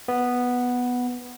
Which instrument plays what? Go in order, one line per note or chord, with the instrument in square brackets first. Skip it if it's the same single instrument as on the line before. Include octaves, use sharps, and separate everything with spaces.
[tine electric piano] B3